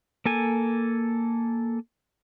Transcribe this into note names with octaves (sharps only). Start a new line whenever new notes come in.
A#3 A4 G#5